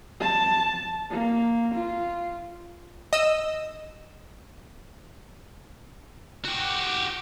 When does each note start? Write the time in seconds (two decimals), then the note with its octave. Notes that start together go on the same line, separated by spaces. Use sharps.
0.20 A5
1.10 A#3
1.74 F4
3.13 D#5 E6
6.45 F#4 G4